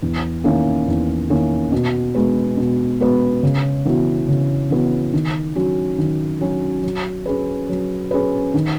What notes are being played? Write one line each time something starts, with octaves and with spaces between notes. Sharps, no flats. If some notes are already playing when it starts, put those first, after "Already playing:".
E2
D#3 A#3 C#4 E4
E2
D#3 A#3 C#4 E4
B2
G#3 B3 F#4 B4
B2
G#3 B3 F#4 B4
C#3
E3 B3 F#4
C#3
E3 B3 F#4
D#3
F#3 C#4 F#4
D#3
F#3 C#4 F#4
F#3
C#4 G#4 B4
F#3
C#4 G#4 B4
D#3